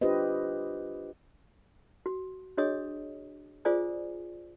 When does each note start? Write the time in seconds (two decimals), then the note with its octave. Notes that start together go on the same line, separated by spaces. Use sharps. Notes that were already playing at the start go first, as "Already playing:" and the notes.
0.01 D4 F4 G4 B4 C5 D#5
2.06 F#4
2.57 D4 F#4 G#4 C#5 D#5 D#6
3.65 F4 G#4 C5 D5 G#5 D#6